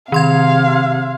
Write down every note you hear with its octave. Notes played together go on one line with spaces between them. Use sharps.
C3 D#3 F5 C6 G#6